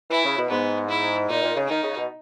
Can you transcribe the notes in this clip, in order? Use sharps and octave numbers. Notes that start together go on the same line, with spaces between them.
E3 E4
C#3
B2
G#2 B3
E4
A#2 D#4
A#2
C#3
D#3 D#4
C#3
B2